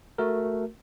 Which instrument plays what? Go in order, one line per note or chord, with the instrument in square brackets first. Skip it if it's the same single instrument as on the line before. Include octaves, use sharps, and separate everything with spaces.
[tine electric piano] A3 F#4 A#4